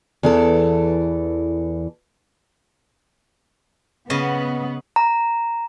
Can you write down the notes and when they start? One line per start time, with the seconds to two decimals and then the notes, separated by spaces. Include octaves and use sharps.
0.23 E2 E3 A4
4.10 C#3 B3 D#5
4.96 A#5